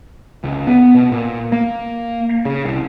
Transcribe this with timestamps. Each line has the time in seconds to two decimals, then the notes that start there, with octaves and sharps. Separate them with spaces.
0.44 C#2
0.67 B3
0.94 B2
1.12 A#2
1.52 A#3
2.45 C#3
2.65 C2